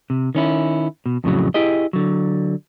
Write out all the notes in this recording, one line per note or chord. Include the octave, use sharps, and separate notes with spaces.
C3
D#3 C#4 E4
B2
F2 A2 C#3 F#3
E4 G4 G#4 D#5
D3 F#3